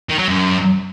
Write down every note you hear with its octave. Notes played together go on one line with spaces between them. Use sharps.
D#3
F#3
F#2